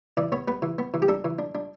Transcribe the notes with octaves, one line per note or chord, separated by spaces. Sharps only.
E3 D5
B3 C#5
B3 B4
E3
B3
E3
G4
D4 A4
E3
D4
D4